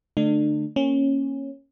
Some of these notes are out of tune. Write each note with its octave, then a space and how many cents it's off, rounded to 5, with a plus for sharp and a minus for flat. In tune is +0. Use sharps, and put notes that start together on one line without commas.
D3 +0 A3 +0 D4 +35
A#3 +0 C#4 -15